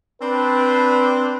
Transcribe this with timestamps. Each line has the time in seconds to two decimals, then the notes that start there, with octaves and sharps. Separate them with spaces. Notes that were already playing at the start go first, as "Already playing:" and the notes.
0.22 C4 D4 B4